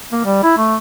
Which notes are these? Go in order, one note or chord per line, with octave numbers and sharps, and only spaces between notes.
A#3
G3
E4
A3